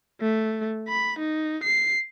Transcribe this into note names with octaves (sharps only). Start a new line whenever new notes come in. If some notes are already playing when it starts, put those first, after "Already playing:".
A3
B5
D#4
C7